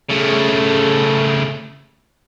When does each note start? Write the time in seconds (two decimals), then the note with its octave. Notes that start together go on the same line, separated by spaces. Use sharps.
0.09 C#3 A3